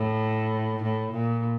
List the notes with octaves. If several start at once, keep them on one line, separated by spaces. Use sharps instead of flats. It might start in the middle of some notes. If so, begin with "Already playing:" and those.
Already playing: A2
A2
A#2